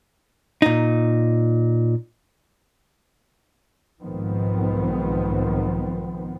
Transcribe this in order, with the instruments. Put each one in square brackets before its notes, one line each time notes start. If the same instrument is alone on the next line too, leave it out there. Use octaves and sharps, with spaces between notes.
[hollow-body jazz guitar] A#2 D#4
[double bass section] B1 G#2 D#3 F3 B3 C4